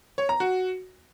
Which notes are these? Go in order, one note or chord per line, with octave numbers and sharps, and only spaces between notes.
C#5
A#5
F#4